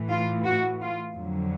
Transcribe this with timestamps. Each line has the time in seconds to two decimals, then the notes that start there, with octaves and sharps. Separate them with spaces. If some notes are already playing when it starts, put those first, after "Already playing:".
Already playing: A2 E3
0.10 F4
0.44 F#4
0.81 F4
1.16 F2 D3 F#3